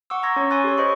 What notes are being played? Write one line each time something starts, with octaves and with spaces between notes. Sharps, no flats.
F#5 C#6 D6 E6
A#5 C6 C#6 E6 G#6 A#6
C#4 C#5
G#5 C6 C#6 E6 F#6 A6
G4 A4 C#5
C5 D#5 B5 C#6 D#6